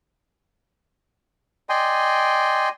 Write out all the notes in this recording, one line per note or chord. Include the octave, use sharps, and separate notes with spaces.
D5 D#5 G5 G#5 C6